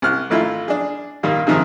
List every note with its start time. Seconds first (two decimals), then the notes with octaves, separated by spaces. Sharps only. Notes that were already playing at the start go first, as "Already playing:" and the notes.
0.02 C2 F6 F#6
0.30 G#1 A3 E4 F4
0.68 D4 G#4
1.23 A#2 D#3 G3 A#3
1.47 G#2 C3 D#3 F3